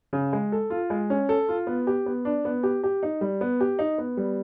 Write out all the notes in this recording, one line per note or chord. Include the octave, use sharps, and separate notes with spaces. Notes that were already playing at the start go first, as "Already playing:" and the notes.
C#3
G#3
A4
F4
G#3
C#4
A4
F4
B3
G4
B3
D4
B3
G4
G4
D#4
G3
B3
G4
D#4
B3
G3